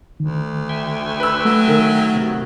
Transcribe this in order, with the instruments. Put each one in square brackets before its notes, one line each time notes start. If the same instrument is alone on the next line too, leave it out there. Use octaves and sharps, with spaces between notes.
[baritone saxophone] D2 [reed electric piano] D#3
[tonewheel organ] E5 G5 G#5
[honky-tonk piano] B4 E6
[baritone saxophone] F#3 [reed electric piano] A3
[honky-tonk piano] D#3
[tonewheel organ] C3 B3 F#4